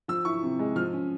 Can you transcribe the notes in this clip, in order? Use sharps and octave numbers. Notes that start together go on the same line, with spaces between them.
F3 E6
E4 C#6
C3
G#3
F3 F6
C#4